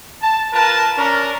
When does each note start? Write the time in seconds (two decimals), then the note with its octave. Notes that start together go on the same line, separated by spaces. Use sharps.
0.22 A5
0.53 F4 A#4 B4 A5
0.96 C#4 D4 A#4